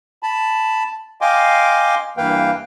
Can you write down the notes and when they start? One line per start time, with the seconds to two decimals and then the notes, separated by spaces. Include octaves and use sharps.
0.23 A5 B5
1.21 D#5 F5 G5 G#5 C6 D6
2.17 G2 E3 A#3 B4 F5 G5